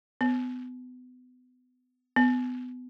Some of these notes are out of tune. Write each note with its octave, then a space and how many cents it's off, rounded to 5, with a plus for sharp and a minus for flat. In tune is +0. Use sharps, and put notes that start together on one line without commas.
B3 +30
B3 +25